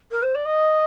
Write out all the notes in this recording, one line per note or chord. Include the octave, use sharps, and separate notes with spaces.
A#4
C5
D5
D#5